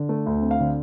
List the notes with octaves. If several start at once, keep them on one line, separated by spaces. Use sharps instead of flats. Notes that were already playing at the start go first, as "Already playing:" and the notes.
Already playing: D3
A3
D2
C4
F5
D3